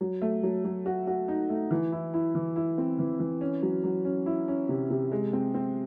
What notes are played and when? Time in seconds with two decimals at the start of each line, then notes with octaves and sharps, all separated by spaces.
0.01 F#3
0.22 A3
0.43 F#3
0.64 F#3
0.86 F#4
1.07 F#4
1.28 D#4
1.50 A3
1.71 E3
1.92 E4
2.14 E4
2.35 E3
2.56 E4
2.78 C4
2.99 E3
3.20 E3
3.41 C#4
3.62 F#3
3.84 F#3
4.05 C#4
4.26 E4
4.48 C#4
4.69 C3
4.90 C3
5.12 G#3
5.33 C4
5.54 C4